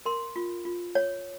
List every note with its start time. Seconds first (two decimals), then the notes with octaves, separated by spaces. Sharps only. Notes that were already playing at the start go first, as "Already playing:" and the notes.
0.06 A#4 C6
0.36 F4
0.65 F4
0.95 C#5